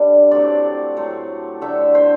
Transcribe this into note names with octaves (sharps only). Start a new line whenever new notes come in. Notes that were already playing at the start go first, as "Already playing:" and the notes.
Already playing: D3 G3 D4
A2 F#3 A3 C4 D5
A2 F#3 A3 C4
D3 F#3 A3 E5
C5